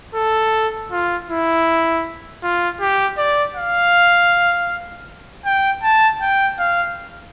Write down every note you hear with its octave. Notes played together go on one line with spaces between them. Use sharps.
A4
F4
E4
F4
G4
D5
F5
G5
A5
G5
F5